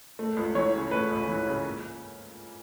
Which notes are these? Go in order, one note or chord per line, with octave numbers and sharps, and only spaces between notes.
A3
C#2
E3 C#5
C#3
A3 B4
C#2
E3
C#3
A#3